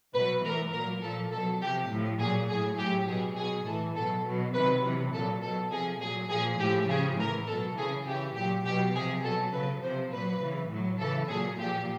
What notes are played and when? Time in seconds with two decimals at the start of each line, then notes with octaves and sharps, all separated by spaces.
0.14 B2 F#3 B4
0.44 A2 E3 A#4
0.73 A#2 F#3 A#4
1.03 A#2 F3 A4
1.32 B2 F#3 A4
1.61 C3 G4
1.66 F3
1.90 A2 F3
2.20 A#2 F#3 G#4
2.49 F#3 G#4
2.53 A2
2.78 A2 F#3 G4
3.08 B2 F#3 G#4
3.37 B2 F#3 G#4
3.66 A2 E3 A4
3.96 B2 F#3 A4
4.25 B2 F#3
4.54 C3 D#3 F#3 B4
4.84 C3 E3
5.13 A#2 F#3 A4
5.42 B2 F#3 A4
5.72 C3 F3 G#4
6.01 A#2 F#3 G#4
6.30 A#2 F3 G#4
6.60 A2 F3 G4
6.89 C#3 F3 G#4
7.18 A2 E3 A#4
7.48 B2 F#3 A4
7.77 C#3 E3 G#4
8.06 C#3 E3 G4
8.36 A#2 F#3 G4
8.65 B2 F#3 G4
8.95 C3 F3 G#4
9.24 B2 F#3 A4
9.53 C#3 F#3 B4
9.83 C3 F3 C5
10.12 A#2 F#3 B4
10.41 C#3 E3
10.70 A2 F#3
10.99 C#3 E3 A4
11.29 A#2 F#3 G#4
11.59 A#2 F3 G4